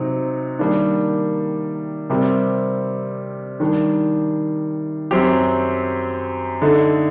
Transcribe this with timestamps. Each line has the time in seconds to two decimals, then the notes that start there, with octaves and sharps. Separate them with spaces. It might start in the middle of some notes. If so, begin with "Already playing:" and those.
Already playing: C3 F#3 C4 D#4
0.59 D#3 G3 A#3 D4
2.10 C3 G3 C4 G4 A#4
3.60 D#3 G3 D4
5.11 F#2 F#3 C4 G4
6.62 D3 A3 D#4 A4